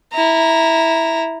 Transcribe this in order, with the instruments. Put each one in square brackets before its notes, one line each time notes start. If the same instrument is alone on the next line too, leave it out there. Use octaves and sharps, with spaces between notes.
[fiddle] E4 A#5